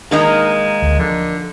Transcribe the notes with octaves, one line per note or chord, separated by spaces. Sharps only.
D#3 G#3 A#3 D#4
D2
D3 F3